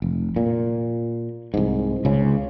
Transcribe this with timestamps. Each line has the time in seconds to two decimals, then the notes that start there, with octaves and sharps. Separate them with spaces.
0.02 F1
0.36 A#2
1.54 C2 G#2
2.05 C#2 C#3